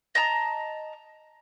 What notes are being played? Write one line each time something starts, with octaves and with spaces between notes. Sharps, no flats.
D#5 A5 A#5